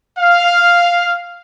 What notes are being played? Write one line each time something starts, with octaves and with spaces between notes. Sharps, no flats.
F5